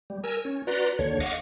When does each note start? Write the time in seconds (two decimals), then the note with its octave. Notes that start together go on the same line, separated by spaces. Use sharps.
0.10 G3
0.24 A#4 G#5 E6
0.45 C#4
0.67 F#4 B4 D5 A#5 C6
0.99 D#2 D3 C#5
1.20 D#5 F5 F#5 C#6 D6